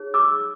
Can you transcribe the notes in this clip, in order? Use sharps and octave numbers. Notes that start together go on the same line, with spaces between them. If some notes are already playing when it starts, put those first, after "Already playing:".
Already playing: D#4 G#4 C#5
D6 E6